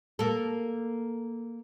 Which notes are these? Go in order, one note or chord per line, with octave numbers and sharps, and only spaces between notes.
A#3 A4